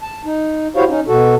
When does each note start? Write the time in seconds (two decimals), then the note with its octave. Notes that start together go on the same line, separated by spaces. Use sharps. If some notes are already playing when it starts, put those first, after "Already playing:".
0.02 A5
0.25 D#4
0.76 E4 F#4 G4 C5 C#5 F5
0.89 C#4 D#4
1.08 B2 F#4 A4